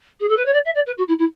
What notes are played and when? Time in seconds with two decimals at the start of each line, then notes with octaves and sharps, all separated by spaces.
0.20 G#4
0.28 A4
0.36 B4
0.45 C#5
0.53 D5
0.65 E5
0.75 D5
0.86 B4
0.97 F#4
1.08 E4
1.18 E4